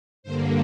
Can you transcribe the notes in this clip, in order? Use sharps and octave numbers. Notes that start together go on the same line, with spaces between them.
G2 D3 A#3 C5